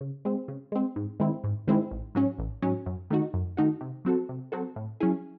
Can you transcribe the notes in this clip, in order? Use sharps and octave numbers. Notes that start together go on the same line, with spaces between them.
C#3
G#3 C4
C#3
G#3 C4
G#2
D#3 G#3 C4 E4
G#2
D#3 G#3 C4 E4
A1
G#2 F#3 C#4
A1
G#2 F#3 C#4
F#2
D#3 A3 D#4 F#4
F#2
D#3 A3 D#4 F#4
C3
F#3 C4 F#4 A4
C3
F#3 C4 F#4 A4
A2
F#3 C#4 E4 G#4